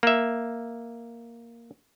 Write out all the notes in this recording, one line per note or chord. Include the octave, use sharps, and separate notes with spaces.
A#3 E5